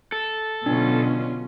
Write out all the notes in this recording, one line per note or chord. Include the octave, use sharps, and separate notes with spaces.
A4
B2 D3 F#3 C#4 D4 F4